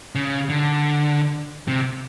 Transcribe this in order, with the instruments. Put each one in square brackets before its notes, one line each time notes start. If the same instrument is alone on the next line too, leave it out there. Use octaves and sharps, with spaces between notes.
[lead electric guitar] C#3
D3
C3